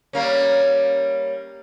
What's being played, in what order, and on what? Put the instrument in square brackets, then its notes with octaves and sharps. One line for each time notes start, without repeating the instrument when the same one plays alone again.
[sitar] G3 A#3 C#4